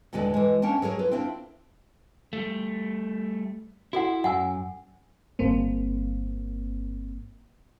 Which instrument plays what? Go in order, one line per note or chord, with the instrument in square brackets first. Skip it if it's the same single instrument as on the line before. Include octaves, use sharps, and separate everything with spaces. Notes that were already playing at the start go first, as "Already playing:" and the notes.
[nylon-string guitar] D#2 A#2 D3 G#3 B4 D5
E3 G#3
A#3 C#4 D4 G5 A5
F#3 G#4 A#4 C#5
F4 B4
C4 D4 E4 F4
[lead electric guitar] G3 A3
[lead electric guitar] E4 [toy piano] F#4 A4 F#5
[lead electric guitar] F#2 [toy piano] F#5 G#5 E6
[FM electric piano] G1 G2 A#3 C4